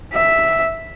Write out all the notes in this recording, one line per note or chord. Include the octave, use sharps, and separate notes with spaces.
E5